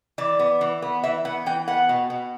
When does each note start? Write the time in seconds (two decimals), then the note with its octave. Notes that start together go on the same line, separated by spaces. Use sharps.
0.18 E3 D5
0.39 B3
0.61 E3
0.82 B3
1.04 E3 E5
1.25 B3 F#5
1.46 E3 G5
1.68 B3 F#5
1.89 B2
2.10 B2